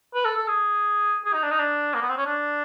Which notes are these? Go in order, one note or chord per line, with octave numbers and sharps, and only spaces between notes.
B4
A4
A4
G#4
G#4
D#4
D4
D#4
D4
A#3
B3
C4
C#4
D4